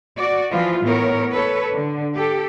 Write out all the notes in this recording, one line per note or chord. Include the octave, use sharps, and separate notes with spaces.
F#4 D5
E3 F3 F4
A2 E3 B3 A#4 C#5
A4 B4 C#5
D3
G4 A4